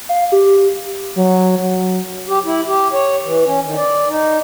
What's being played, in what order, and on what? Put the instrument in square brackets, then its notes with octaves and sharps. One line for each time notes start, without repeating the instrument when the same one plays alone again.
[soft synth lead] F5
G4
[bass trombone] F#3
F#3
[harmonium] G4
E4
G4
C#5
E3
C#4
D#3
D5
D#4